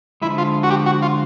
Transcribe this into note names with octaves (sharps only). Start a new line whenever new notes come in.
D3 F3 G#3 E4
F4
F#4
G4
F#4
F4